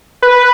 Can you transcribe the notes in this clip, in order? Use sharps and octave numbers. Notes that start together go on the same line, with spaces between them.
B4